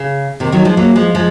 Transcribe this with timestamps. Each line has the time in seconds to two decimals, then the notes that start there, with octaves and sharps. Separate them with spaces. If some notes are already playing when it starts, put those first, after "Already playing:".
Already playing: C#3
0.40 C3 D#3
0.52 D#3 F#3
0.65 F3 G#3
0.77 F#3 A#3
0.96 F3 G#3
1.15 F3 G#3